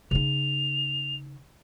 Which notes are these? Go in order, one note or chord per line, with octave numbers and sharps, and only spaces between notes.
C#3 D#4 F7